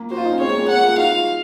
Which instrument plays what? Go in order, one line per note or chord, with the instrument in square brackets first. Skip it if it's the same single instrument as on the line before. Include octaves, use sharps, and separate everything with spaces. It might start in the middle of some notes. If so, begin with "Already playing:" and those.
Already playing: [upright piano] A#3
[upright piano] F#4 [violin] C5
[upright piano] F4
D#4
C#4
[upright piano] G#3 C4 [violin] C#5
[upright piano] A#3
G#3
[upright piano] A#3 [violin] F#5
[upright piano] F4 G#4
[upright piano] D#4 F#4 [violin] F5
[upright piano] F4 G#4